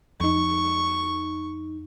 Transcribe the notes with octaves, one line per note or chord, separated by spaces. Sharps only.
F2 D#4 C#6